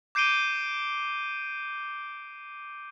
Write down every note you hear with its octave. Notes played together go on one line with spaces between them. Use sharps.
D6 G6 C7 D7 D#7 G7